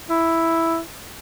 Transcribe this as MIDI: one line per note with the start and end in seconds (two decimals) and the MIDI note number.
0.10 0.80 64